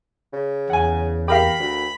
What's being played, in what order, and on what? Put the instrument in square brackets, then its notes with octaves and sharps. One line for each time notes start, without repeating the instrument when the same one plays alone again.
[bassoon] C#3
[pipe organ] E2 [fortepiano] F#5 G#5
[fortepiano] G4 A#4 F5 [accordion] B5
[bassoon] D2